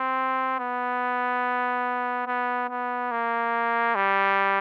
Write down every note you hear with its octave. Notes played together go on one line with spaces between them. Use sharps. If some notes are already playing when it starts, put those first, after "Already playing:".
Already playing: C4
B3
B3
B3
A#3
G3